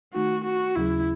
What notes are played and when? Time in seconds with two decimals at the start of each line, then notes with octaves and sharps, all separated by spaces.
0.14 D#3 A3 D#4 F#4
0.45 F#4
0.76 D#2 C#3 F#3 C#4 E4 G#4